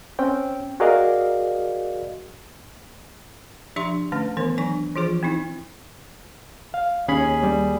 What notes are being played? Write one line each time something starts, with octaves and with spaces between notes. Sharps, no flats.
C4 C#4 G5
F#4 G#4 A#4 D5 D#5 F5
F3 D4 G4 E5 C6 C#6
D3 A3 C#4 A5
D#3 E3 B3 A#4
F#3 D4 G#5 C#6
E3 F3 F4 G#4 C5
C4 D#4 E4
F5
D#2 C#4 G#4 B5
G3